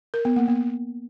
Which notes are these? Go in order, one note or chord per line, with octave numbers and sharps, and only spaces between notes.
A#4
B3
A#3
B3